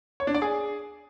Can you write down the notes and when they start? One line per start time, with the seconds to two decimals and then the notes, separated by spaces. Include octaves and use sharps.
0.20 C#5
0.27 D4
0.35 D5
0.42 G#4